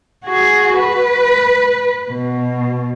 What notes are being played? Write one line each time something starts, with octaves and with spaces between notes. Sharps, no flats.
F#4 G#4
B4
B2